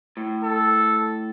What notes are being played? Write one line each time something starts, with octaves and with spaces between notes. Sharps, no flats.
A2
A4